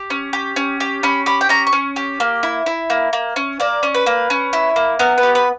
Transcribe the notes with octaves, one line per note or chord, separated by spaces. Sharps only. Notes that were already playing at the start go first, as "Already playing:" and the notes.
Already playing: G4
C#4
G4
C#4
G4
C#4 B5
G4 B5
G5
C#4 A#5
C#6
C#4
G4
A#3
E4
E4
A#3
A#3
C#4
A#3 D5
C#4
B4
A#3
C#4
E4
A#3
B3 A#4
B4
G4
B4